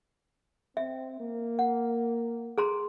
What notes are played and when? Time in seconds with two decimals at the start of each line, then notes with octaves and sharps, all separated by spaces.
0.77 C4 E5
1.19 A#3
1.59 F#5
2.58 G#4 A#5 C6